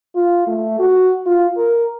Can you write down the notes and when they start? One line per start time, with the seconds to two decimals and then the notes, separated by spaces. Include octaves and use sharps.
0.15 F4
0.47 A3
0.79 F#4
1.26 F4
1.57 A#4